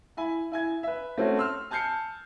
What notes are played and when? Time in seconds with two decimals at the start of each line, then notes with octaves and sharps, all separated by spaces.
0.17 E4 G#5 B5
0.51 E4 G#5 G#6
0.83 B4 E5
1.18 A3 C4 C#4 F#4
1.37 C6 E6 F6
1.71 G#5 A5 F6 G6 C7 C#7